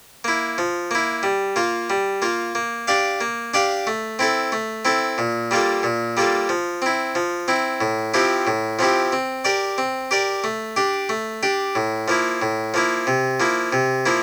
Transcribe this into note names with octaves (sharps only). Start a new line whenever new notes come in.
A#3 E4
F3
A#3 E4
G3
A#3 F4
G3
A#3 F4
A#3
D4 G4 D5 F5
A#3
D4 G4 D5 F5
A3
C4 E4 A4
A3
C4 E4 A4
A#2
G3 A#3 F4 A4
A#2
G3 A#3 F4 A4
F3
C4 E4
F3
C4 E4
A2
F3 C4 E4 G4
A2
F3 C4 E4 G4
C4
G4 A#4 D5
C4
G4 A#4 D5
A3
D4 G4
A3
D4 G4
A2
F3 A#3 E4
A2
F3 A#3 E4
C3
F3 A#3 E4
C3
F3 A#3 E4